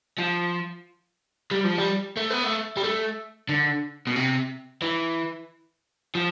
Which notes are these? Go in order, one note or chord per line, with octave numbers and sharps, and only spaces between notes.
F3
G3
F3
G3
A3
B3
A3
G3
A3
D3
B2
C3
E3
F3